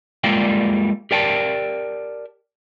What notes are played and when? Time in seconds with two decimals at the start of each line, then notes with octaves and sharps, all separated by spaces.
0.24 G3 G#3 A#3 F4 D5 G5
1.11 G4 A#4 D5 G5 A5